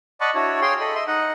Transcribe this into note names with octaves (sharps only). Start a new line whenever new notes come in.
D5 D#5 F#5 A5 B5 C#6
D4 E4 F#4 C#5
G#4 C#5 F5 G5 C6
A4 D#5 B5
D#5 E5 C6
D#4 D#5 F#5